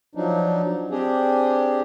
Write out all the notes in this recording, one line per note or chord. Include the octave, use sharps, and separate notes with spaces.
F3 F#3 D4 D#4
C4 D4 G4 G#4